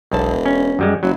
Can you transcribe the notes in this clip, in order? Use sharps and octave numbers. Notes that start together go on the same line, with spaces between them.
E1 B1 A5
C#4
F#2 G3 G#3
F#1 F#3